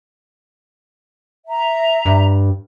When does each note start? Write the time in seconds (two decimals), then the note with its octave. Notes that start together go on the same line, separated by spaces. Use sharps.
1.47 E5 A#5
2.05 G2